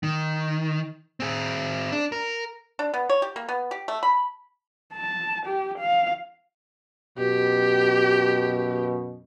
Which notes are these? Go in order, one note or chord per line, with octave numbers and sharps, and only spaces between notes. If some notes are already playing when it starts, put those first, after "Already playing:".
D#3
C4 G#4
D4
A#4
D4
B3
C#5
G4
A#3
B3
G4
A3
B5
A5
G4
F5
F#2 B2 G4